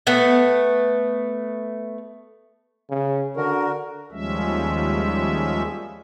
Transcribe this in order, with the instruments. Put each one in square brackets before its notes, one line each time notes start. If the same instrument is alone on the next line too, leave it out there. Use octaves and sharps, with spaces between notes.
[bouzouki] A3 B3
[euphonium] C#3
[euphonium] D3 [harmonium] F#4 A#4
[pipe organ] D#2 F3 G3 G#3 C#4 E5